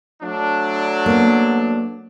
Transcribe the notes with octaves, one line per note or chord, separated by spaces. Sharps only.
F#3 A3 D4
A#3 B3